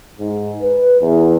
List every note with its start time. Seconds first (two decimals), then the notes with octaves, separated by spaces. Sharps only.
0.19 G#2
0.62 B4
1.01 E2